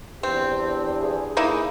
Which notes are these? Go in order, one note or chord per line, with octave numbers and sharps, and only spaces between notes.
E2 C4 D4 G4
G#4
A#3 D#4 E4